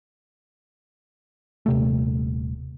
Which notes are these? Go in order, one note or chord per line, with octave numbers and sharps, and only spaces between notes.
D#1 C3 A3